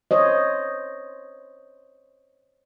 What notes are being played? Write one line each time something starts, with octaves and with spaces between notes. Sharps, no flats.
C5 C#5 D#5